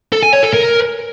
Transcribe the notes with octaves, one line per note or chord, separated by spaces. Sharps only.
A4
G#5
C#5
A4
A#4